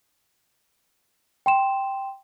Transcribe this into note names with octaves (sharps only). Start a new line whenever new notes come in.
G5 C6 E7